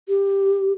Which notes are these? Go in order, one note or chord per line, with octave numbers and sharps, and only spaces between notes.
G4